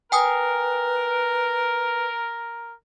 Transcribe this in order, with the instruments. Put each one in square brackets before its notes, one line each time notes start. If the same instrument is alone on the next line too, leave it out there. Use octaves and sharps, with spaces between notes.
[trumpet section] A#4 [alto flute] B4 [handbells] G5 G#5 D#6